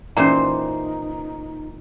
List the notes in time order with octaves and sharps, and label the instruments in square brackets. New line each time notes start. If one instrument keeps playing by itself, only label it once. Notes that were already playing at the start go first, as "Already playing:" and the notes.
[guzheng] A#2 E3 C5 [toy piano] C#4 A#5 [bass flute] D#4